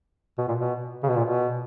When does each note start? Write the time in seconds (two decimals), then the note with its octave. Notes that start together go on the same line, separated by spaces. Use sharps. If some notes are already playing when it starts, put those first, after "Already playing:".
0.38 B2
0.48 A#2
0.60 B2
1.03 C#3
1.09 B2
1.16 A#2
1.24 B2